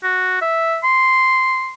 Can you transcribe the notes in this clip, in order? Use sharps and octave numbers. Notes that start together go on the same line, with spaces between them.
F#4
E5
C6